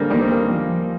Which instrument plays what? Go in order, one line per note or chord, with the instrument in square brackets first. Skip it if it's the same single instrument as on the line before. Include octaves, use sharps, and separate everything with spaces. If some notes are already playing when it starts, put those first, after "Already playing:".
Already playing: [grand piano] D3 [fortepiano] G3 G#3 A#3 C4
[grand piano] D#2 [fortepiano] D#3 G3
[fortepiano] C4
G3 A#3
[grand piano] F3